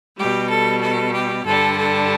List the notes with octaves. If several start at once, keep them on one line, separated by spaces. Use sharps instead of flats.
B2 G3 G4
A4
A4
G4
G2 D3 G3 A4
A4